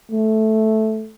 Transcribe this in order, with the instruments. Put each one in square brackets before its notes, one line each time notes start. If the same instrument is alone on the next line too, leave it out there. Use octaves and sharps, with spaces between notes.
[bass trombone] A3